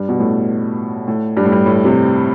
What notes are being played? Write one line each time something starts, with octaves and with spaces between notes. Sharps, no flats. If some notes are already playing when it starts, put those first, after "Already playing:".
Already playing: G2
B2
A2
A2
G2
A2
G2
A2
C3